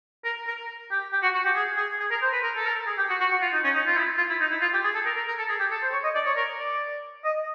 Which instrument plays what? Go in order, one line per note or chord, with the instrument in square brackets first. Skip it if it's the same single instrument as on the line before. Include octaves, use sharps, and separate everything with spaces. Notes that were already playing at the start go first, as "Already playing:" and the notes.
[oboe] A#4
A#4
G4
G4
F#4
F#4
G4
G#4
G#4
G#4
A#4
C5
B4
A#4
A4
A#4
G#4
G4
F#4
F#4
F#4
F4
D#4
C#4
D#4
F4
E4
F4
E4
D#4
E4
F4
G4
G#4
A4
A#4
A#4
A#4
A4
G#4
G4
A4
C5
C#5
D#5
D5
C#5
A#4
D5
D#5